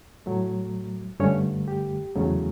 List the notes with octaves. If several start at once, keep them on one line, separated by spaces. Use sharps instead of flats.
A2 F#3 A3
G2 D3 A3 C#4 C#5
G4
E2 C#3 F#3 A3